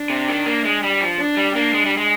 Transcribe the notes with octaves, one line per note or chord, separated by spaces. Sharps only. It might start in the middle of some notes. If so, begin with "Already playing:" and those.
Already playing: D4
C3
D#3
A#3
G#3
G3
F3
D4
G3
A#3 D4
G#3
G3
G#3